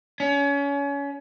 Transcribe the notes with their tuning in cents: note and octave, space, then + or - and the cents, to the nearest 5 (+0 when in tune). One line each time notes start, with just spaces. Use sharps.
C#4 +30